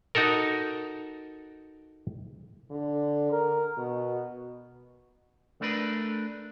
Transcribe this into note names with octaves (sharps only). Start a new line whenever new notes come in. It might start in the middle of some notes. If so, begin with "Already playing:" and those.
D#4 F#4 A4 A#4
D3
A#4
B2
A3 D4 A#4 B4